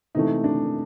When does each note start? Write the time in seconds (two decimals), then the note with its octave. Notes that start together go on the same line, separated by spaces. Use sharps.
0.15 C3 E3 A3 D#4
0.44 D4